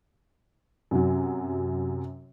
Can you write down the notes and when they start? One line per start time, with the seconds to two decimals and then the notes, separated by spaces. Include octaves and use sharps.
0.91 F#2 C3 F#3